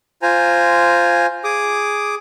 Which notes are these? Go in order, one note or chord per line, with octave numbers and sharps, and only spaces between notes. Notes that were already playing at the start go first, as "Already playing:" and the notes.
F4 C5 G#5 A#5
G#4 D6 D#6